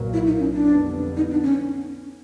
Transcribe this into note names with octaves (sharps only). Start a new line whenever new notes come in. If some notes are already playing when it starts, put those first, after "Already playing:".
Already playing: B1 A#2 F#3 A#3
E4
D#4
C#4
D4
F2 D3 G3 B3
D#4
D4
C#4